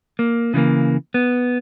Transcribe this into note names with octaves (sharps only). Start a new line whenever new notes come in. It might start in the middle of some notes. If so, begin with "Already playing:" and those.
A#3
C#3 E3 G3 A#3
B3